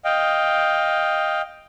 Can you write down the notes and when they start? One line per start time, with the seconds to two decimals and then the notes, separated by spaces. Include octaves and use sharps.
0.05 D#5 F5 G5